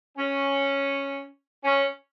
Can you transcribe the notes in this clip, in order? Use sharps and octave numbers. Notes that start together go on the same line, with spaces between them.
C#4
C#4